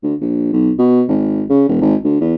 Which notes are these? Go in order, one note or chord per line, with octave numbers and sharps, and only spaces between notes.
D2
A#1
B1
B2
G#1
C#3
E1
G#1
D2
E2